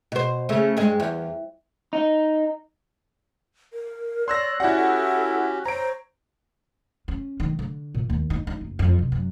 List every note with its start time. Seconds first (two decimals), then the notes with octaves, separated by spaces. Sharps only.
0.12 B2 C5
0.49 C#3 A3
0.77 G2 G#3
1.00 E2
1.93 D#4
3.73 A#4
4.28 C#5 D5 C6 E6 F#6 A#6
4.60 C#4 E4 F#4 G4 D5 F#5
4.77 A4
5.66 C5 C#5 A#5 D7
7.08 C#4
7.40 D#3
7.59 D3
7.95 A#2
8.10 D#2
8.30 D#4
8.47 D#4
8.61 F#1
8.79 F2
8.99 C3
9.12 F#2